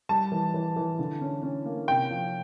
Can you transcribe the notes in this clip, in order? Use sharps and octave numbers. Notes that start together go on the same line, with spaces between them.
G3 A5
E3
E3
E3
D3
C#4
C#4
A#3
C3 G5
F3